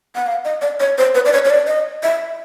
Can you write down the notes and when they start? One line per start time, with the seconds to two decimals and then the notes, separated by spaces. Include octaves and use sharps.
0.16 F#5
0.27 F5
0.45 D#5
0.62 D5
0.80 C#5
0.98 C5
1.15 B4
1.25 D5
1.33 C#5
1.45 C#5
1.50 D5
1.67 D#5
2.03 E5